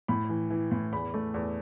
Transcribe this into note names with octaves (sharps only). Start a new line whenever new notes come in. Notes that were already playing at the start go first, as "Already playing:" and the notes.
A2 B5
E3
E3
A2
E2 B5
A3
E2